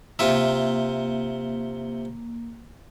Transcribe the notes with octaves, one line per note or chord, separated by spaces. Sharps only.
C3 A#3 F4 E5